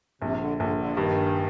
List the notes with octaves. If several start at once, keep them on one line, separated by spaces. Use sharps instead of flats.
A#1 C3
D3
A#1 D3
D3
F3
G2 D#3